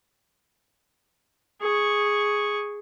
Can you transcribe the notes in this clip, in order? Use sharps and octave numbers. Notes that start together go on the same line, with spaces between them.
G#4 C#6